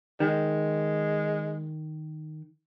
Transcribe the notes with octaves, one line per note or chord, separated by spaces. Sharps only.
D#3 G#3